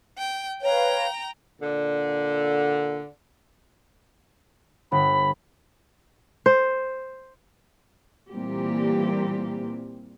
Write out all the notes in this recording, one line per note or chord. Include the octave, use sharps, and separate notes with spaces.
G5
B4 C#5 F5 G5 A#5
A#2 D3
G1 B5
C5
A#2 E3 G3 A#3 C4 G4